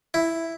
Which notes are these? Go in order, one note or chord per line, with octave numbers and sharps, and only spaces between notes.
E4